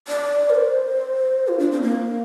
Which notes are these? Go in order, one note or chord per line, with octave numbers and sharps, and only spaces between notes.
D5
A#4
C5
F4
D4
C4
A#3